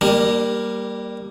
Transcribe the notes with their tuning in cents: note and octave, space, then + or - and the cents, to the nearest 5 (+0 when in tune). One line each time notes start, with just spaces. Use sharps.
G3 +0 A#3 +0 D4 +45